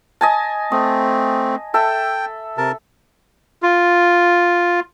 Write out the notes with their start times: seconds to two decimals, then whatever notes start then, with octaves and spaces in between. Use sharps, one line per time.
0.21 D#5 G#5 A5
0.72 A3 C4 D#6
1.74 A4 E5 G5
2.58 C3 A#4 A5
3.63 F4